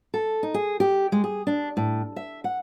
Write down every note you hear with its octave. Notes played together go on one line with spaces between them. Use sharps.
A4
D#4
G#4
G4
G#3
G#4
D4
A2
E5
F#5